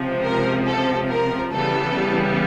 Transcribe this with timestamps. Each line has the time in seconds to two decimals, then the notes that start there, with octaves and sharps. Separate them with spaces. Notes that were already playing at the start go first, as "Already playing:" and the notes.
Already playing: C#2 C3 F3
0.24 A#4
0.66 A4
1.09 A#4
1.52 C#3 E3 G3 B3 A4